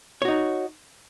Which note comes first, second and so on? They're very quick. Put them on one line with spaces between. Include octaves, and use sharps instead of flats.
C#5 F#4 D#4